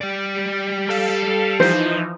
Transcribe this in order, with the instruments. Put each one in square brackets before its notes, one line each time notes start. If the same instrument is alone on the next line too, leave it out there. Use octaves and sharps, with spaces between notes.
[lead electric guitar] G3 D5
[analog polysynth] A4 F5
[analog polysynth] E3 F3 D#4 [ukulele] C5